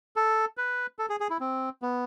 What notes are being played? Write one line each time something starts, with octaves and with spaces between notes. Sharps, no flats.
A4
B4
A4
G#4
G#4
E4
C4
B3